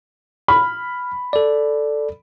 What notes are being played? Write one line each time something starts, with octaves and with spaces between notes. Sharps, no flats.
B5 F6
A4 D5